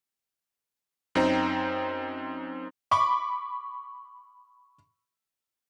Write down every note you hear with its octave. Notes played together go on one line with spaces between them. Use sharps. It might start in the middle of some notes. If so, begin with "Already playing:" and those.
F#2 C4 D#4 C5 G5 A#5
B5 C#6 D6